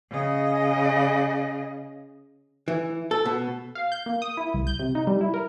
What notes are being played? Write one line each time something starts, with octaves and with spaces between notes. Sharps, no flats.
C#3 D#5
E3
A4
B2
F5
G6
A#3
D#6
E4
C2
G6
C3
D#4
G3
E4
A#4